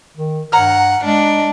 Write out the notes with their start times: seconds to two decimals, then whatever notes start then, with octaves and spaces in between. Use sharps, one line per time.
0.17 D#3
0.52 G2 C#5 F#5 A#5 F6
1.04 G#3 D4